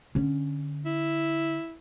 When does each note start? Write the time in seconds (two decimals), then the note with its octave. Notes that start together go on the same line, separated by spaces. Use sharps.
0.15 D3 C#4
0.85 E4